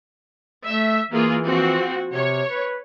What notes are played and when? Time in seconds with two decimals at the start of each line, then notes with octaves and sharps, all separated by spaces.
0.66 A3 E5
1.10 E3 A#3 F4 G#4
1.45 F3 C4 F#4
2.13 C3 C#5
2.49 B4